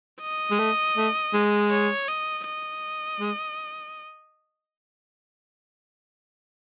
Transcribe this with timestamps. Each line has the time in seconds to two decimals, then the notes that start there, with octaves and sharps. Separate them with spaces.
0.22 D#5
0.51 G#3
0.59 A3
0.97 A3
1.33 G#3
1.71 C#5
2.08 D#5
2.45 D#5
3.20 G#3